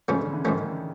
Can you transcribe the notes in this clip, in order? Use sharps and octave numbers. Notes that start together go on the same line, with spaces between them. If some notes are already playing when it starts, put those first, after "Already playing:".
G#2 C#3 F3 A3 C#4
D3
E3
G#2 D#3 F3 A3 C#4